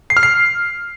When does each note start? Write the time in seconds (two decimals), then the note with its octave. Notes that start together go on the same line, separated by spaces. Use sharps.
0.10 C7
0.17 F6
0.23 C7